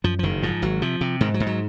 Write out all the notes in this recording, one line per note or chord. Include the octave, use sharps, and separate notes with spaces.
F#2 F3
F3
F#1 D#3
G#2 F3
G#1 F#3
C3 F3
C3
G#2 D#3
F#3
G#2
F#3